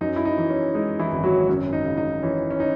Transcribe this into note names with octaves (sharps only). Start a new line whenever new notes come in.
F#2 D#4
E4
D#4
E3
C#4
G#3 D#4
E3 E4
G#1
F#3 F#4
F#2 C#4
D#4
C#3
D#4
E3 C#4
C#4
D#4